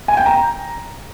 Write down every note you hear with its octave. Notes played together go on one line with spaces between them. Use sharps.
G#5
G5
A#5